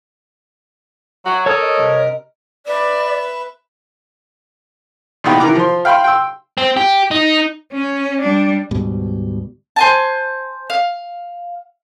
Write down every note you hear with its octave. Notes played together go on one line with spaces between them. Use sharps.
F#3 F#4
A4 A#4 C#5 D#6
D#5
G2 C3
B4 D5 E5
A#2 E3 B3 D#4 G4
D#3 E3 A#4 A#5 D6 F#6
F3 C6
F5 G5 B5 C6 F6
G5 C6 E6
C4
G4
D#4
C#4
G3 D4
D2 G#2 B2 G3
C5 G#5 A5
F5